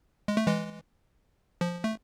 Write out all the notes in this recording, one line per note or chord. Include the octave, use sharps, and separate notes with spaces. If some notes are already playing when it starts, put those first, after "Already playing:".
G#3
A3
E3 G#3
F3
A3